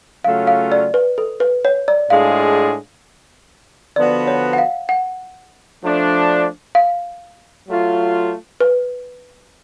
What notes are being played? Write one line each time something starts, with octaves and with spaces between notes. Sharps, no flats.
C#3 F#3 A3 C#4 F4 F5
F5
D5
B4
A4
B4
C#5
D5
A2 G#3 D4 F4 G#4 F5
D3 F3 B3 F#4 D5
C#5
F#5
F5
F#5
F3 A3 D4
F5
F#3 A3 F4
B4